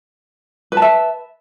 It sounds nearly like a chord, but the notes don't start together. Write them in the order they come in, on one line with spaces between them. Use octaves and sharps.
B4 A5 E5